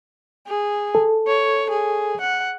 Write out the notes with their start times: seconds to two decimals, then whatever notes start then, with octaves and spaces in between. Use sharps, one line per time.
0.47 G#4
0.95 A4
1.27 C#5
1.70 G#4
2.21 F#5